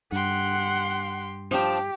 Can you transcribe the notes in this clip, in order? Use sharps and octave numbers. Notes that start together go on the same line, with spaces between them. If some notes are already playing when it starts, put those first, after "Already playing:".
G2 G4 F#5 C6
F3 D4 G4